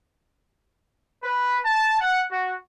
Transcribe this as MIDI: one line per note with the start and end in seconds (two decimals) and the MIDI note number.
1.24 1.58 71
1.65 1.98 81
2.01 2.23 78
2.32 2.54 66